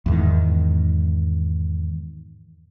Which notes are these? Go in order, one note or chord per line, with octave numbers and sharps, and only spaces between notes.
E2 G#2 D#3